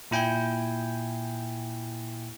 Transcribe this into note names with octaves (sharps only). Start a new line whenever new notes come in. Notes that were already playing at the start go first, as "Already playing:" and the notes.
A#2 E4 G5 G#5 G6